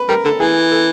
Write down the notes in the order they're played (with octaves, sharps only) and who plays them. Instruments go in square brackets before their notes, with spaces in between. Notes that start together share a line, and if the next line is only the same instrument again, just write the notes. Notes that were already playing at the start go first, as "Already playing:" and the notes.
Already playing: [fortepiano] B4
[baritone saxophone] G3 [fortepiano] A#4
[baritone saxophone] D3 [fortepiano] A4
[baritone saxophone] E3 [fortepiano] G#4
[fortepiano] A4